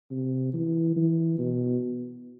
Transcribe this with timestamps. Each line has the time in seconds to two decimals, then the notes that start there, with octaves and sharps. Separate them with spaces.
0.11 C3
0.53 E3
0.96 E3
1.39 B2